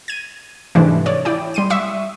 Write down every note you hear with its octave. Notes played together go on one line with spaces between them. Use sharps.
G#6 D#7
G#2 C3 E3 A3 D4
C#5 D5
E4 D5 G5
G3 C6 D#7
E5 C#6 D#6